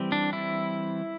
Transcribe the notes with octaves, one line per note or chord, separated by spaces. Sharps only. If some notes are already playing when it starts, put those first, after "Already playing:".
Already playing: E3 G3 C4
D4
E4